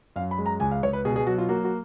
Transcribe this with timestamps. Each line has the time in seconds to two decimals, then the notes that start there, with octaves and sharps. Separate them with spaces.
0.16 F#2 F5
0.31 B5
0.38 G#3
0.46 A#5
0.60 C#2 G#5
0.71 F5
0.83 C#2 C#5
0.93 B4
1.05 B2 G#4
1.16 G#4
1.27 F#3 F#4
1.38 F4
1.49 A#3 F#4
1.64 F#4